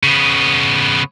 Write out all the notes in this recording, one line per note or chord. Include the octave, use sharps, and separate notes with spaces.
C#3 B3